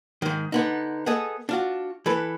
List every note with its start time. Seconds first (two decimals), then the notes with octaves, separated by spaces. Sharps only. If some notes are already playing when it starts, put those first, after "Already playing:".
0.22 G#2 D#3
0.52 D3 B3 D#4
1.06 B3 G#4 A4 D#5
1.49 D4 F4 F#4
2.06 E3 A4 B4